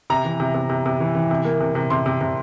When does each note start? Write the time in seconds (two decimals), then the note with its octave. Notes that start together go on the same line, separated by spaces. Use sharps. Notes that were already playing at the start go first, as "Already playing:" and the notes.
0.10 C3 A#5
0.25 E3
0.40 C3
0.54 C3
0.70 C3
0.86 C3
1.00 E3
1.15 E3
1.31 C3
1.45 A#3
1.60 C3
1.75 C3
1.90 C3 C6
2.06 C3
2.21 C3